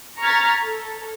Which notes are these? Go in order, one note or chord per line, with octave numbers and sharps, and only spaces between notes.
A#5 C#6 F6 G#6 A6 B6
A4